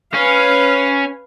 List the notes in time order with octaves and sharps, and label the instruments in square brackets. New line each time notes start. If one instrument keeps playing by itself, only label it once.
[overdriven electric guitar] C#4 [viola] B4 F5